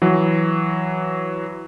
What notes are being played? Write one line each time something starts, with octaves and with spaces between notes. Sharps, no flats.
E3 F#3